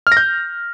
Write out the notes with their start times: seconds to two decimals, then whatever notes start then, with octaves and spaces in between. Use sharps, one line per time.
0.07 F6
0.12 A#6
0.17 G6